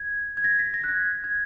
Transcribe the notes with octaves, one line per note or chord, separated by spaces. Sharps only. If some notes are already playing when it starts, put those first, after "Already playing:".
Already playing: G#6
G#6
A#6
B6
A#6
F#6
G#6
G#6